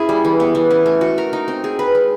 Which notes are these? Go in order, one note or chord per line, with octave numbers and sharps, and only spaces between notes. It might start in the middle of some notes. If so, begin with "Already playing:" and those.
Already playing: C#4 E4 G#4
G3
E3
B3
E3
C#4
A3
F#4
A#4
D#4
C4
G#4
B4
G#3